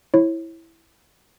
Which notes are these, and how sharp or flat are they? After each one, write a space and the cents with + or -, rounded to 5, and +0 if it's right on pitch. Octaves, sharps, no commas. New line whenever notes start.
E4 +0 C#5 -35